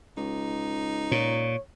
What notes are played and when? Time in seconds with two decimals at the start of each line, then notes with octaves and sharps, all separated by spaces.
0.17 C#2 D#4
1.11 A#2 C#5